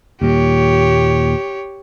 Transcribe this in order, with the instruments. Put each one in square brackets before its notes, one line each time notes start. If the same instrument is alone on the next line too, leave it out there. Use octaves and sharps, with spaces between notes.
[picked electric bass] D#2 A#2 [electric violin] G4 C#5